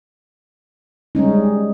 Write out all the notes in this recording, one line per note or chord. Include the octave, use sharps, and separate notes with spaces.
G3 G#3 C#4 D#4